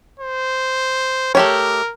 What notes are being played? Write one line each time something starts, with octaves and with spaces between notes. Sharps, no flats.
C5
A3 G4 A#4 C#5